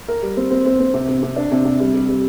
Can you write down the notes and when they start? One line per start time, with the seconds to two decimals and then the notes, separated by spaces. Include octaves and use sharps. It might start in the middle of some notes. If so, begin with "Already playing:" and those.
0.08 A#4
0.22 G3
0.37 C4
0.51 C4
0.66 C4
0.80 C4
0.94 C3
1.08 C3
1.23 C3
1.36 D4
1.52 C3
1.65 C3
1.80 G3
1.94 G3
2.09 G3